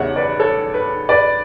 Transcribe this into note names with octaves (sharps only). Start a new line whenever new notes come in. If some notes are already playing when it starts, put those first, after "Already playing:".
Already playing: E1 E2 C#3 G3 C#5 E5 F#5
B4 D5
A4 C#5
B4
B4 D5